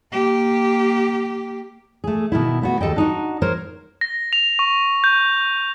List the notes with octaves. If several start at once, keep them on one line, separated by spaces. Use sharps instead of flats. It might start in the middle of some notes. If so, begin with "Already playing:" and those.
A#3 G4
A3 G#4
B2 D#3 E4
A3 B3 F#4
D#2 G4 A4 D#5 G5
D4 D#4 F#4
A#4 C5 C#5
A#6
F7
C#6
G6